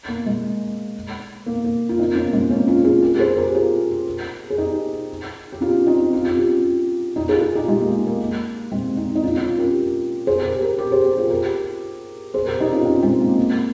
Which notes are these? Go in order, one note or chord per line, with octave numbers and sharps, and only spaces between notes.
A#3
G#3
A#3
A#3
F4
C4 D#4
A#3 C#4
A#3
G#3 C4
A#3 C#4
C#4 F4
F4 G#4
G4 A#4
G#4 C5
G4 A#4
F4 G#4
G#4
D#4 G4
G4
C#4 F4
C4 D#4
F4
G4
C#4 F4
D#4 G4
F4 G#4
F4 G#4
D#4 G4
G#3
A#3
A#3
G#3 C4
C4 D#4
D#4
C#4 F4
C#4 F4
G4 A#4
G#4 C5
G4 A#4
G4 A#4
G4 A#4
G#4 C5
G4 A#4
F4 G#4
G4 A#4
G#4 C5
G4 A#4
D#4 G4
C#4 F4
C4 D#4
G#3 C4
A#3
A#3